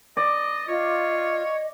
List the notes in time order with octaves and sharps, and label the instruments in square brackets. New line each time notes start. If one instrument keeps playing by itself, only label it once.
[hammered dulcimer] D5 [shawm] D#5
[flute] F4 [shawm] C#5 [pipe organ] D#5